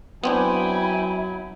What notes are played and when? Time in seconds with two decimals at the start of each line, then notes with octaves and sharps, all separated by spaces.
0.24 F#3 B3 C4 D4 E4 G5 G#5